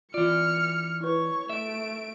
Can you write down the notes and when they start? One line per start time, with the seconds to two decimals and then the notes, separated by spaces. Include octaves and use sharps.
0.14 E3 F4 D5 F6 C#7
1.01 E4 B4 C#5 C#6
1.50 A3 E5 D7